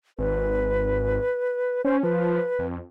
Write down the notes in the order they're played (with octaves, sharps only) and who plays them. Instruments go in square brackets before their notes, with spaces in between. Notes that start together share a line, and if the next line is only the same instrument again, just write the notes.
[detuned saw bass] G#1 [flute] B4
[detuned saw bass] C#4 [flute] C5
[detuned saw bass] F3 [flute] B4
[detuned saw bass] F2